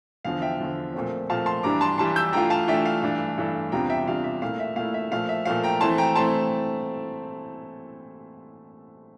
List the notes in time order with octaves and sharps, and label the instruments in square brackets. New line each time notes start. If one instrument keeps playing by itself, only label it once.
[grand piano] E2 D3 F3 F5
E5 G5
E2 D3 F3
A#2 F3 A3 C4
A#2 F3 A3 C4 F5 A5
A5 C6
G2 E3 G3 D4 A#5 D6
A5 C6
G2 E3 G3 D4 A5 C6
E6 G6
E3 A3 D4 F4 G5 A#5
F5 A5
E3 A3 D4 F4 E5 G5
F5
G2 E3 A3 D4
G2 E3 A3 D4
E2 C3 G3 D4 F4 G5 A#5
E5 G5
E2 C3 G3 D4 F4 F5
E5
A#2 A3 E4 F5
E5
A#2 A3 E4 F5
E5
A#2 F3 A3 F5
E5
A#2 F3 A3 F5
G5 A#5
E3 A3 C4 E4 A5 C6
G5 A#5
E3 A3 C4 E4 A5 C6